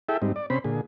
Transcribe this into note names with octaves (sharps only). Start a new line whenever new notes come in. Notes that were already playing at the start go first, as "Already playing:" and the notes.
E4 G#4 A4 E5 G5
G#2 G3 C4 D#4
D5
C3 C4 C#4 C5 B5
A#2 D3 G#4